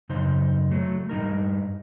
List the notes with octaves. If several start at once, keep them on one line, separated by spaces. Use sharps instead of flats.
F#2 C#3 D#4 C5
F#3 A3
G2 A#2 D#4 A#4